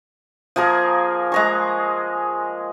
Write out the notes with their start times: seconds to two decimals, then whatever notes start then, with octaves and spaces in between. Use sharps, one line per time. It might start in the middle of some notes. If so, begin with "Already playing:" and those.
0.56 F3 A#3 G#4 A#4
1.32 G#3 A#5 C#6